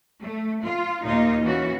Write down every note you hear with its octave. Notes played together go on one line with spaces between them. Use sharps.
A3
F4
D#2 A#2 A#3 D#4 F4 D#5
E3 C#4 F#4